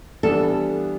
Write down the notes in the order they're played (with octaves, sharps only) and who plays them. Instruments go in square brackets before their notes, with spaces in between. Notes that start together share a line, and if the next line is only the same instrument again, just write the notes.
[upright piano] E3 G3 B3 D4 [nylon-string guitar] A4